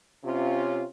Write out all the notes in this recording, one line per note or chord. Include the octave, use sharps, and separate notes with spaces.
C3 C#4 F4